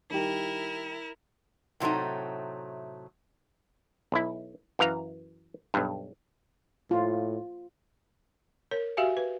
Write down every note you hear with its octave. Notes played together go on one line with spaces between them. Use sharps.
D#3 G3 E4 G4 A#4
A2 C3 F#3 A3 D#4
B1 E4
F#2 E3 F5 A#5
B1 G2
A2 F4
A#4 C#5
F#4 G4 E5 F5 G#5
B4